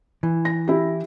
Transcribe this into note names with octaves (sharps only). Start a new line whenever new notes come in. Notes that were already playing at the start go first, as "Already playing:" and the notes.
E3
A#6
E4 G4